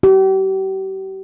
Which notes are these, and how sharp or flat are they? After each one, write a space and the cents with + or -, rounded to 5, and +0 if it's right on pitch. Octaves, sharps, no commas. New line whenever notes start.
G4 -40